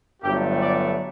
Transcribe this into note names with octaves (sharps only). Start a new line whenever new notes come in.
G1 G2 F#3 A3 G4
D5